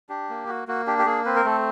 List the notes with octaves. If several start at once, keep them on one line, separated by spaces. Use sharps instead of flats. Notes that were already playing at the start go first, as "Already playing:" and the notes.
D4 G4
A#3
F#4
A#3 F#4
D4 G4
G4
A#3 G#4
C4 B4
A#4
A3 A4